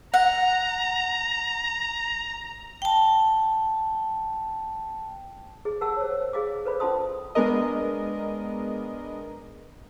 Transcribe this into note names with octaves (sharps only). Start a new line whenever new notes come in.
F#5 A#5
G5 A5
G#4 D#5
G4 A#4 F#5 A5 E6
C5 C#5
G#4 D#5 F5 D6
A4 B4 C5 D5 B5
C#4 F4 C5 A5 C6 D#6
G#3 B3 D4 A#4 D#5